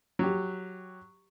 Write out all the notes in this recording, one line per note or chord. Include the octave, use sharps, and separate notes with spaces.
F#3 G4